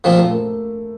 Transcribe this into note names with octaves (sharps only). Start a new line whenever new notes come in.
A#2 F3 A3 C4
A3
A#3